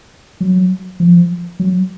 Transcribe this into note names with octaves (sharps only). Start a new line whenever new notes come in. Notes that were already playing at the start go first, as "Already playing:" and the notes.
F#3
F3
F#3